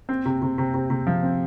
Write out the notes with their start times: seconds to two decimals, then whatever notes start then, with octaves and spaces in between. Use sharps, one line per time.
0.09 C4
0.26 C3
0.42 C3
0.58 C3
0.74 C3
0.90 C3
1.07 F3
1.23 C4